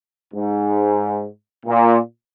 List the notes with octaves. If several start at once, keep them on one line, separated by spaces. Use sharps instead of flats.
G#2
A#2